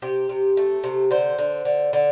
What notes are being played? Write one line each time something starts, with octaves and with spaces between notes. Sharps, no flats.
C3 G4
C3
A3
C3
D3 C5
D3
D3
D3